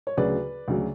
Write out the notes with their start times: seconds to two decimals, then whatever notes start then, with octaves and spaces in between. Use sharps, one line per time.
0.07 C#5
0.17 D2 C#3 F#3 B4 D5
0.68 D2 C#3 F#3